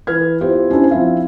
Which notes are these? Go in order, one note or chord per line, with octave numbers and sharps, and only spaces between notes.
E3 B4 F6 G#6
B3 E4 F4 G4 C5
C#4 D4 E4 G4 C5
F3 C4 E4 E5 F5